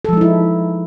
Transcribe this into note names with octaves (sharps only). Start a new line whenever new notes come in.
F3 G#3 D#4 E4 A4